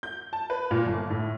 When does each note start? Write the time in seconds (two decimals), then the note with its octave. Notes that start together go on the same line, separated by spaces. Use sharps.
0.03 G6
0.33 A5
0.50 B4
0.71 A#2
0.86 G1
1.10 A2